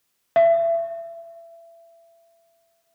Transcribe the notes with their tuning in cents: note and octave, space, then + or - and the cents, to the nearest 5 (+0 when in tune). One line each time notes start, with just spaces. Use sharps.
E5 +30